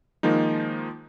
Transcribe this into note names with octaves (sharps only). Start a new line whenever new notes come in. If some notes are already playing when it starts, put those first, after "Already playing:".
D#3 F3 G#3 A#3 D#4